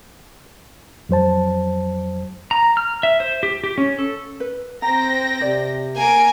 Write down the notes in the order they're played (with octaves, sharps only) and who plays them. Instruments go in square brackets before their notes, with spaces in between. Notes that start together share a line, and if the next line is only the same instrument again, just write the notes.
[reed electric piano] F2 F#3 C5 A5
[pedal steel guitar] A#5
F6
E5
C5
G4
G4
C#4
A4
[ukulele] B4
[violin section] C4 G5 A#6 [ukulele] A#5
[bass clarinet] C3 [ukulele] D5
[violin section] A#3 A#5 D7 [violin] G#5